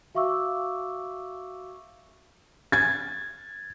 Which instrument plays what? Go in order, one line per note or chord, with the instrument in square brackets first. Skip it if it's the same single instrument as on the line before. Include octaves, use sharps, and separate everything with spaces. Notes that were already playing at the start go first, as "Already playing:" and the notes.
[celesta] F#4 E5 F5 C#6 D6 E6
[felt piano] G#6 A6